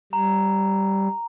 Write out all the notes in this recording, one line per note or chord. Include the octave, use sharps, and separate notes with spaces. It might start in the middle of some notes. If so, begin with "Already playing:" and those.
G3 A#5